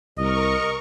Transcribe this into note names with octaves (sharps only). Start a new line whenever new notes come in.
C2 A#4 D#5 C#6